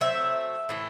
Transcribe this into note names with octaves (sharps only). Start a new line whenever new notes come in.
F#3 A3 C4 E5
A2 E3 A3